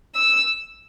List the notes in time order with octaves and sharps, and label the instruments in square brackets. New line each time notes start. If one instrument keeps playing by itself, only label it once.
[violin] E6